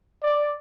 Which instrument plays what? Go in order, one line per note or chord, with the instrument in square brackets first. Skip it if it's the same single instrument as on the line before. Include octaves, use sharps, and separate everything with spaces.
[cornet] D5